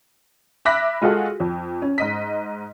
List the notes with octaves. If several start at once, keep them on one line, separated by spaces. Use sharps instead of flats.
E5 B5 D6 F#6 A#6 B6
G#3 F4 F#4 G#4 A4
F2
C#4
G#2 D#5 B6